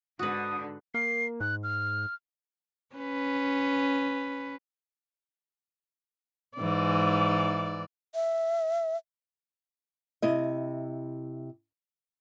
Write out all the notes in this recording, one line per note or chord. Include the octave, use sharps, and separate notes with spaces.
G#2 D3 F#4 B4 D#6
A#3 C7
G#2 F#6
F6
C#4 B4
G#2 E3 D5
E5
C3 E4 D#5